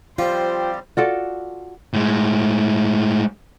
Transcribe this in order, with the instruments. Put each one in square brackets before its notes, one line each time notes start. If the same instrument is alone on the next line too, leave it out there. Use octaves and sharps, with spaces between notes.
[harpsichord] F3 [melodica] G3 C4 G4 [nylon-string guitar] F4 [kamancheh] C5
[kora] F4 F#4 A4 D5
[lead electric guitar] A2 G#3